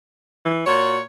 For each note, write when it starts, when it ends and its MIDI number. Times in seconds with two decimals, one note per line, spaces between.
0.45 0.64 52
0.67 1.02 46
0.67 0.98 66
0.67 1.02 73